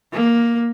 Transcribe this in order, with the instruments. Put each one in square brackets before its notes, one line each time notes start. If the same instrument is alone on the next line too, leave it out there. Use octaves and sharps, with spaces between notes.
[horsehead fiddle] A#3